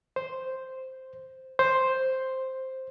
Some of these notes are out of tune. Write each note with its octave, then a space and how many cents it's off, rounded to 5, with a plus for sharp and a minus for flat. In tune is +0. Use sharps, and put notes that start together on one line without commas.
C5 -5
C5 +0